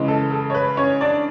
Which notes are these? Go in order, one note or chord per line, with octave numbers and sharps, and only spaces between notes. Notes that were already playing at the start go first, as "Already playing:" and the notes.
Already playing: C#3 E3 G#3
A4
A4
C#5
B4
C#4 C#5
D4 D5